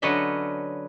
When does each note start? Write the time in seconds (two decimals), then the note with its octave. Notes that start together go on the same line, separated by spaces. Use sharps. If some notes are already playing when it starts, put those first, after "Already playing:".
0.02 D3 F#3 C#4 B4 D#5 E5